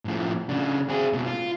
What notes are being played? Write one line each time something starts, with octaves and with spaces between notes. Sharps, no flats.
A2 F3
C#3 D4
C4 G#4
C#2 B2
F4